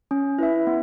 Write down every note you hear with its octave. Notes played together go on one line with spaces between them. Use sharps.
C#4
E4 B4 E5
B3